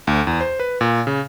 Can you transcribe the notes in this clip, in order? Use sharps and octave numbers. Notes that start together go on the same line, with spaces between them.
D2
E2
C5
B4
A#2
C#3